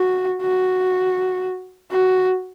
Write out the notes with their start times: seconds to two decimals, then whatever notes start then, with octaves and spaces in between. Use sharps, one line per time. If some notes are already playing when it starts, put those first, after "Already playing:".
Already playing: F#4
0.42 F#4
1.91 F#4